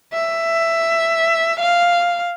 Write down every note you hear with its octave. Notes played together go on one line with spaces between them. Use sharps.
E5
F5